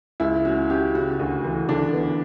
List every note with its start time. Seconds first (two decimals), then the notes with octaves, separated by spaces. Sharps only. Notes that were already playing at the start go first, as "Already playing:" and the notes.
0.20 C#2 E4
0.45 C#4 F#4
0.70 C#4 G4
0.95 C#3 F#4
1.20 D2
1.45 E3
1.69 D3 D4
1.93 B3